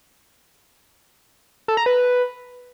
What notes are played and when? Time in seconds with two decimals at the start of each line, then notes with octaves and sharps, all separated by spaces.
1.68 A4
1.77 A#5
1.86 B4